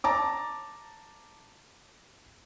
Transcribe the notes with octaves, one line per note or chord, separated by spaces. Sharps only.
A5 A#5 D6